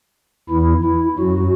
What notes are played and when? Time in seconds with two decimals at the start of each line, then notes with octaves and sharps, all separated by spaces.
0.49 E2 E3 E4
0.84 E4
1.19 F#2 F#3 F#4